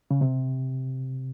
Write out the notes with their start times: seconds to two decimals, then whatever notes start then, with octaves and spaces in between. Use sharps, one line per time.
0.11 C#3
0.21 C3